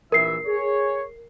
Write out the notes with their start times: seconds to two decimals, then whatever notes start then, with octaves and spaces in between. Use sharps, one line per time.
0.12 A#1 E3 A#4 E5 C7
0.46 G#4 C#5